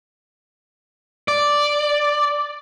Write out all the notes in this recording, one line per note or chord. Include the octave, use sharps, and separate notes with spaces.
D5